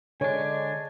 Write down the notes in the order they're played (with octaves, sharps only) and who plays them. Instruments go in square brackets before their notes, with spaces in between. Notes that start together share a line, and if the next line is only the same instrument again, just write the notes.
[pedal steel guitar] D3 D4 [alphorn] G#3 [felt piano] C#5 [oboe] G#5